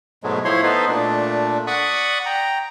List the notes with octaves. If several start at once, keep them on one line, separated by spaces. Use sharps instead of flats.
G#2 B2 F#3 G#3 A3
A2 F3 E4 C5 C#5 C6
B3 D#4 A4 B4 C5
A#2 A3 D4
D5 F#5 B5 C#6 D#6
G5 A#5